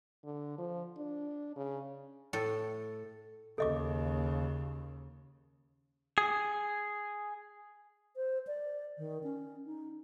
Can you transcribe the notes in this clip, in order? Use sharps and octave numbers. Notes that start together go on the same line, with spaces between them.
D3
F3
D4
C#3
A2 A4
D#2 C#3 A4 D#5 D6
G#4
C5
D5
D#3
C#4
D#4